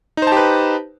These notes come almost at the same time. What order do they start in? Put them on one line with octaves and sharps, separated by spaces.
D#4 C5 A5 G4 B4